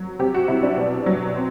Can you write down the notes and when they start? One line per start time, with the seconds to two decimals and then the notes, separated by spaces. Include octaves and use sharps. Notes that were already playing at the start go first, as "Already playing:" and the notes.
Already playing: F#3
0.19 C3 G4
0.34 F#4
0.48 C3 E4
0.63 D4
0.77 B2
1.06 F#3
1.35 C4